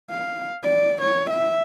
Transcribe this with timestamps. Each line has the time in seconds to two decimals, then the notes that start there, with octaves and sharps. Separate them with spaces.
0.10 F5
0.63 D5
1.02 C#5
1.30 E5